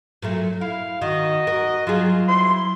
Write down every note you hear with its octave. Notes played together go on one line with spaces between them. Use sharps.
A#2 F#3 A3
E4 F5
D#3 F#4 D#5
F#4 A#4
F#3 F4 G#4
E4 C6